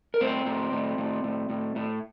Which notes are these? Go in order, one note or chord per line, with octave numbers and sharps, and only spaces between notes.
A#4
A2 C4 C5
A2
A2
A2
A2
A2
A2